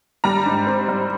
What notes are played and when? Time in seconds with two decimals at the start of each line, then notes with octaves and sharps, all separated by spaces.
0.24 G3 A#5
0.46 G#2
0.67 C4
0.89 G3